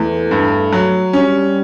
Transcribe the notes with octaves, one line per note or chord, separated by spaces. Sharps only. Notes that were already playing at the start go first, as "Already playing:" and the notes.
Already playing: E2 A3
G2
F#3
G3 C#4